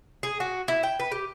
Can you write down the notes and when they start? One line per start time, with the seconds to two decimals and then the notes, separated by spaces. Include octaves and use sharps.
0.23 G#4
0.40 F#4
0.68 E4
0.83 G5
1.00 B4
1.12 G4